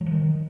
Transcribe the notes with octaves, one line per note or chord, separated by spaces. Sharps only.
F#3
F3
D#3